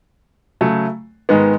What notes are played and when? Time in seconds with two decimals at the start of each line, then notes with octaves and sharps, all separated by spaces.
0.61 C#3 F#3 A3
1.29 G#2 D#3 G#3 B3